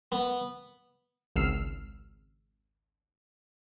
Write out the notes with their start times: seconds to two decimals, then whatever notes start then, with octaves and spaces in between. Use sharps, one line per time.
0.12 B3
1.36 G#1 C#2 E6 F6 C7